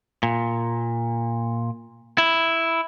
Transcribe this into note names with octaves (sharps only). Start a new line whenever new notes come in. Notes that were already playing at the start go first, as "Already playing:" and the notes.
A#2
E4